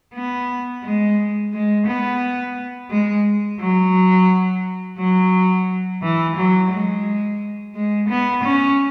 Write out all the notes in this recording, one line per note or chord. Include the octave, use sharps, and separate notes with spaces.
B3
G#3
G#3
B3
G#3
F#3
F#3
E3
F#3
G#3
G#3
B3
C#4